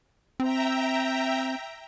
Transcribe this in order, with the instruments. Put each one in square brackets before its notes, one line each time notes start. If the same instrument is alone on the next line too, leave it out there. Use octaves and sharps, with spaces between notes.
[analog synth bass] C4 [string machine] E5 G5 A#5